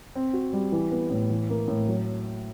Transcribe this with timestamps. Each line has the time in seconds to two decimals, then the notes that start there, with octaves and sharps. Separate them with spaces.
0.15 C4
0.33 F#4
0.53 G3
0.72 E3
0.92 B3
1.10 A2
1.30 E3
1.50 A#3
1.68 A2
1.88 F#3